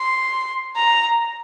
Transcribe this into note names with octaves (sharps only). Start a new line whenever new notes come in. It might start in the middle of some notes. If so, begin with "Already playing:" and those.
Already playing: C6
A#5